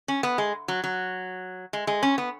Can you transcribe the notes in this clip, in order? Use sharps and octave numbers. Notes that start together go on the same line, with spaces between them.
C#4
B3
G#3
F#3
F#3
G#3
G#3
C#4
B3